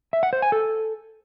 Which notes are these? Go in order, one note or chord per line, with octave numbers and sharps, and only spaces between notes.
E5
F#5
C5
G#5
A4